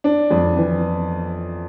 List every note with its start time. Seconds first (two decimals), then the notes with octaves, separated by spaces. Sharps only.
0.04 D4
0.31 F2
0.57 E3